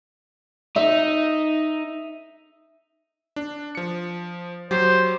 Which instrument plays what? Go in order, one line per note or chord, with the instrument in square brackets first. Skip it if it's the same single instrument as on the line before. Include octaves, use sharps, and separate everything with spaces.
[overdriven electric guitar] D#4 [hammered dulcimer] E5
[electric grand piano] D4
F3 C#7
[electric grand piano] F#3 G4 [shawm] C5